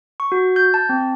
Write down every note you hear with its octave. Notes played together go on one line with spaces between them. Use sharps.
C#6
F#4
G6
A5
C4